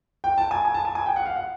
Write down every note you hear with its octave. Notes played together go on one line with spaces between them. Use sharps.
G5
A5
G#5
G#5
A5
G#5
G#5
G5
F#5
F5
F#5